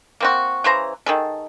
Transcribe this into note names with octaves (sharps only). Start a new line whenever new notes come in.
A#3 C4 F#4
C#3 E3 C5 A#5
D#3 G#4 A4